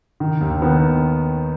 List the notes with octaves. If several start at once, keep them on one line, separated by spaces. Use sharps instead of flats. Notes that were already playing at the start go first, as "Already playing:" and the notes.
D#3
D#2
D#3 B3